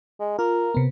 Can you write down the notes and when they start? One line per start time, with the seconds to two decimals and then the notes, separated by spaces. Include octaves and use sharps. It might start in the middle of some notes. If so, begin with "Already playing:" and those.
0.20 G#3
0.39 F4 A#4
0.75 C3 B3